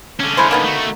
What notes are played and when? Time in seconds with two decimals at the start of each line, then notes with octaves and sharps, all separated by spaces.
0.20 D3 C#4
0.37 G#3 E4 C5
0.51 A#3 B3 D#4
0.65 A3 F#4